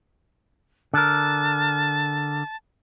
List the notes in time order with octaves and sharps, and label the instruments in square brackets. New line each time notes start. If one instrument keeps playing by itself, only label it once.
[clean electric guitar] D3 A#4 [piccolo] A5